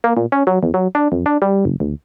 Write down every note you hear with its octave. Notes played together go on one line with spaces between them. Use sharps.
A#3
A#2
C#4
F#3
E2
F#3
D4
F2
D4
G3
F#1
D2